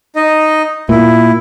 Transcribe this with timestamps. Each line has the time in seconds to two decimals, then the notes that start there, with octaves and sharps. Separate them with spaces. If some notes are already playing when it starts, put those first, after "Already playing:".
0.16 D#4 D#5
0.89 A#2 E4